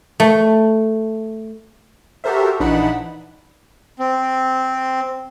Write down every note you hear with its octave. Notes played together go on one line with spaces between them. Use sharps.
A3
F#4 G4 A4 A#4 C5 E5
A#1 E3 D4 D#4 F#5 B5
C4